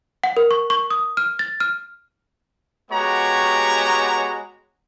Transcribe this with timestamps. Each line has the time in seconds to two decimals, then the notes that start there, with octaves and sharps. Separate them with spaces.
0.24 F#5
0.37 A#4
0.51 C#6
0.70 C#6
0.91 D#6
1.17 F6
1.39 A6
1.60 F6
2.91 G#3 B3 F#4 G4 C#5 A#5